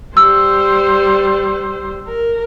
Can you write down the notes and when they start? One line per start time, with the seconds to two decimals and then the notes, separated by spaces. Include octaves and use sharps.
0.17 G3 C5 E6
2.07 A#4